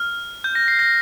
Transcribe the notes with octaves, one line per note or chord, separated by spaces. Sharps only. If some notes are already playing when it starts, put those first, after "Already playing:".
Already playing: F6
G6
A#6
C7
A#6